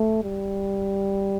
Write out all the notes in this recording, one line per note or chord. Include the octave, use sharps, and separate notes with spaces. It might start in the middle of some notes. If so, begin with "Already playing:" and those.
Already playing: A3
G3